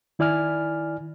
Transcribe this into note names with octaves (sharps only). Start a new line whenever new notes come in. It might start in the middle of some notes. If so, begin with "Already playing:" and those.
D#3 E4 D5 G#5 F6